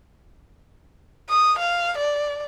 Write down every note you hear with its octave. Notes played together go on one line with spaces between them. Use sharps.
D#6
F5
D5